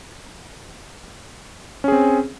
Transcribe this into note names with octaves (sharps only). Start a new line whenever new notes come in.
C4 C#4 G#4